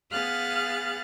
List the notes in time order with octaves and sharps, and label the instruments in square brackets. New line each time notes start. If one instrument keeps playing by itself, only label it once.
[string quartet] B3 G#4 F5 F6 F#6 A6